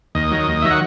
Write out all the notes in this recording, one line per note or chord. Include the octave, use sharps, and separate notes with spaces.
D#2 D#5
D#3 F#3
D#2
D#3 F#3 E5
F#5